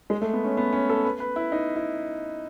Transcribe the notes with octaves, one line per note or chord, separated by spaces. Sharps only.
G#3
A3
B3
C#4
B3
C#4
A4
B4
B4
E4
D#4
E4